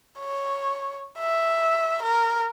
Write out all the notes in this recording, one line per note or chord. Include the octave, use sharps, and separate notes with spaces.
C#5
E5
A#4